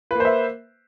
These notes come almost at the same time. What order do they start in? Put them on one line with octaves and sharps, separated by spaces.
B4 A#3 C5 E5